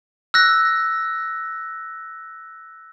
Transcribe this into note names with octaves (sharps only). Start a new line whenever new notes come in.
E6 F#6 A#6